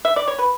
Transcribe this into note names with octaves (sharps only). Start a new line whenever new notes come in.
E5
D5
C#5
B4